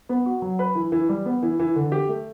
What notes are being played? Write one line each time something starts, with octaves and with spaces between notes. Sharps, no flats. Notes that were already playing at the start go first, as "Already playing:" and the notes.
B3
F#4
F#3
B4
E3
E3
G3
B3
E3
E3
D3
G4
A3